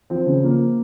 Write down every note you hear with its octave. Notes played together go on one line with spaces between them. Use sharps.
F3 C4
C#3
F3 A#3